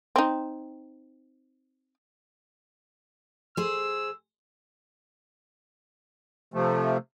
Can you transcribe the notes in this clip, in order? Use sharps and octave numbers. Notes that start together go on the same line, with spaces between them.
C4 D#4
G#4 C5 E6
C3 F3 A3